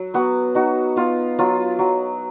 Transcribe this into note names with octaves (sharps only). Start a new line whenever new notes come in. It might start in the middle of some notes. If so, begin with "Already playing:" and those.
Already playing: F#3
B3 F#4
D#4 F#4
B3 F4
F#3 F4
F#3